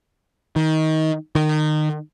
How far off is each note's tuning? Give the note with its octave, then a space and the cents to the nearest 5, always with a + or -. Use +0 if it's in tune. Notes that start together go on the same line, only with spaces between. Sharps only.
D#3 +20
D#3 -25